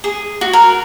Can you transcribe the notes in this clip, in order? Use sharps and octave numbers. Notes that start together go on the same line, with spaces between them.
G#4
F#4
A#4